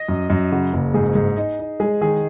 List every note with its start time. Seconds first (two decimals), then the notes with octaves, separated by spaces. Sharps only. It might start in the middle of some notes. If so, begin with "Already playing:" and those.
Already playing: D#5
0.09 F#2
0.30 F#2
0.52 C#3 F#4
0.73 F#1
0.94 G#2 G#4
1.15 G#2
1.37 D#4
1.59 D#4
1.80 G#3 G#4
2.01 D#3 G#4